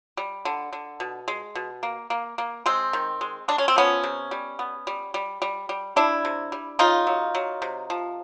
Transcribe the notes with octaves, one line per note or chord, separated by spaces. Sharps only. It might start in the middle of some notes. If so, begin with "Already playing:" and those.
G3
D3
D3
B2
G#3
B2
A#3
A#3
A#3
G#3 C4
D#3
G#3
G#3 D4
C#4
C4
F3 B3 C#4
C3
G3
B3
G3
G3
G3
G3
G3 D4 E4
C3
G3
C#3 D#4 F4
F#3
F#3
C3
F3